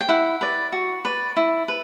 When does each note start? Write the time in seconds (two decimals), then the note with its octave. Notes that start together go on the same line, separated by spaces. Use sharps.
0.01 G5
0.09 E4 F#5
0.41 B4 D5
0.72 F#4
1.05 B4 D5
1.37 E4
1.68 B4